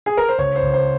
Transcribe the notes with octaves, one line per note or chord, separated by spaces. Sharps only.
G#4
A#4
C5
C#2 C#5
C5
C#2
C5